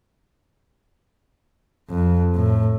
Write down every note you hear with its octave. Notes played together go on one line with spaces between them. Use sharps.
F2
A2